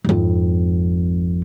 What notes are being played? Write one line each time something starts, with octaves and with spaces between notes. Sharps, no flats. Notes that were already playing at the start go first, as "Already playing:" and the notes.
G#1 F2